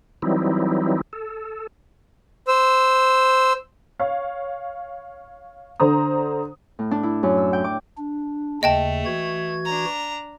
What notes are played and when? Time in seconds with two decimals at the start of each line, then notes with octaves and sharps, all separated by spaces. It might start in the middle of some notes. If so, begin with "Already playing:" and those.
0.22 E3 F#3 G3 C4 D#4 E4
1.13 A4
2.48 C5 E6
4.00 C#5 F5
5.80 D3 C5 A#5 D#6
6.79 A2
6.91 D4
7.03 E4
7.23 F#2
7.37 E6
7.53 G5
7.64 D6
7.98 D4
8.63 D#2 C#3 A3 D#5 G5 A5
9.05 E3 F#4 G#6
9.65 D4 A#5